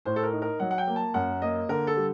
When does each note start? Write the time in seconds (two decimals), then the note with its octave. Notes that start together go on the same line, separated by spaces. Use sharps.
0.05 A2 C5
0.16 A4
0.23 A#4
0.33 D#4
0.42 A#4
0.60 F#3 F#5
0.71 F#5
0.78 G5
0.87 A#3
0.96 A5
1.14 F#2 F#5
1.42 A#3 D#5
1.69 D3 A#4
1.87 A4
1.97 G3